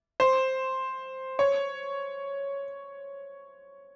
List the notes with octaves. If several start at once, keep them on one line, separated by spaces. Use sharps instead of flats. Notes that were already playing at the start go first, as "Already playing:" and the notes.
C5
C#5